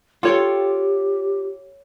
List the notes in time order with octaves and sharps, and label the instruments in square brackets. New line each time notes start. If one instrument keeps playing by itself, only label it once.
[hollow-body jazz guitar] F4 [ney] G4 [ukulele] A4 C#5 G5